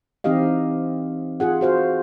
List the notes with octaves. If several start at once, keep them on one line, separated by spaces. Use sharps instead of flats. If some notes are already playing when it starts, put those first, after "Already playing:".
E3 C4 D#4 G4 D#5 F5
F4 G#4 F#5
F#4 C5 F5